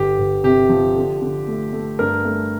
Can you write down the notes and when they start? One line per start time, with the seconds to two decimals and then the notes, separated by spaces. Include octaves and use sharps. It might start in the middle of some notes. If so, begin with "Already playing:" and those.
Already playing: G1 G4
0.18 G1
0.44 C3 G4
0.70 F3
0.95 D3
1.22 D3
1.48 A3
1.73 A3
1.99 G2 A#4
2.25 A3